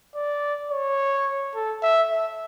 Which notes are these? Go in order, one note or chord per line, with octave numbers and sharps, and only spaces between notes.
D5
C#5
A4
E5
E5